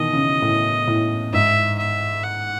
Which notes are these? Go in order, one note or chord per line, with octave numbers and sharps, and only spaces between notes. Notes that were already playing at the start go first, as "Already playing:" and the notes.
Already playing: B2 D#3 E3 D#5
C#3
A2
A2
G#2 E5
E5
F#5